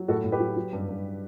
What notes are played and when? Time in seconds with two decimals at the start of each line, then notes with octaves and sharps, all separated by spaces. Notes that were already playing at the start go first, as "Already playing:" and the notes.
Already playing: F#3
0.08 A2 F#4 A4
0.24 A2
0.32 G4 B4
0.40 F#3
0.56 F#3
0.73 G2
0.89 G2